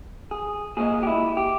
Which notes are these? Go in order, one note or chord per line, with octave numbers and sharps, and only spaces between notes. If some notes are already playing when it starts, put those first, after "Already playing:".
G#4
A#2 G#3 G#4
G4
E4
G4